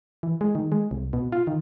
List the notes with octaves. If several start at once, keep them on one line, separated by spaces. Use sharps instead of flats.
E3
G#3
D#3
G#3
C2
B2
F4
D#3